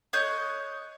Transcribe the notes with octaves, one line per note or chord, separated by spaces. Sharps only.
C#5 D#5 F#6 G6